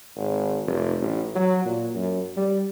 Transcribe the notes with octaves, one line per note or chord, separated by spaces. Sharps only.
G#1
F1
A1
F#3
A#2
F#2
G3